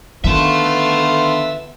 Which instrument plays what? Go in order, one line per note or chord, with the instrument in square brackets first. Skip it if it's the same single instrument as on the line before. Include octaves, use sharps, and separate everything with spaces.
[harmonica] D3 F4 [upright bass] D#3 [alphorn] B3 [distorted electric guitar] E5 A5